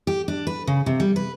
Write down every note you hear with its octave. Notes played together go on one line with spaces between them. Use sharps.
G4
D4
B4
C#3
C3
G3
B4